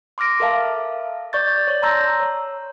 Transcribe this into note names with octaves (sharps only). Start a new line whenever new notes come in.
C6 D6 F6 A#6 D7
A4 A#4 E5 F5 A5
D5 C#6 G6 A6
C#5 D5
A5 A#5 C6 E6 G6 A#6
C#5